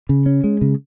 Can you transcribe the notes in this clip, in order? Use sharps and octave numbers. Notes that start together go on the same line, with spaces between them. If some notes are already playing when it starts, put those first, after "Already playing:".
C#3
C#4
G#3
C#3